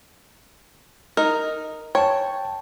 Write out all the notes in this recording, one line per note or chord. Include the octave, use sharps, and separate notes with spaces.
D#4 A#4
C#5 G5 A5